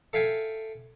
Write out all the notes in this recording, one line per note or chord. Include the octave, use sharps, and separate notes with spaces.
A4 E5 F5 G5 G#5